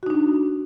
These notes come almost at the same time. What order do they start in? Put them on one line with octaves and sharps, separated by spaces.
F#4 D#4 D4